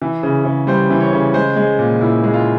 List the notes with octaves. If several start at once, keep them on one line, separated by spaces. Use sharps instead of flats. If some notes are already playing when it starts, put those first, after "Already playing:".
E3
C#3
C#3
G3 C5
E3
C#5
C#3
G#3 C5
G#3
A#2
A#2 E4
G#3
F4